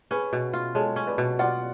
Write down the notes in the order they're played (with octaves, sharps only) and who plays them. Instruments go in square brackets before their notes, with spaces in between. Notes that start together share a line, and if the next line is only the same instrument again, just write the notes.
[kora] C#4 [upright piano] G#4 B4
[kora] B2
F4
[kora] G#3 [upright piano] A4 C#5
[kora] C#4
[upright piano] B4 D5
[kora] B2
[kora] F4 [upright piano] D5 F#5